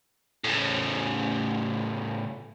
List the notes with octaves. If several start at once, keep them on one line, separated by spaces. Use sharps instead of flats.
A2 C#3